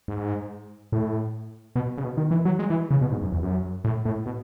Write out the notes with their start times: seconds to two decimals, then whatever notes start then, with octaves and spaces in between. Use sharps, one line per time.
0.08 G#2
0.92 A2
1.76 B2
1.98 C#3
2.04 B2
2.17 D#3
2.31 E3
2.45 F#3
2.59 G#3
2.70 E3
2.91 C#3
3.01 B2
3.11 G#2
3.22 F#2
3.32 E2
3.43 F#2
3.84 A2
4.05 A2
4.26 B2